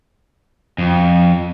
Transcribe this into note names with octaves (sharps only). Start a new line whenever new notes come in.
F2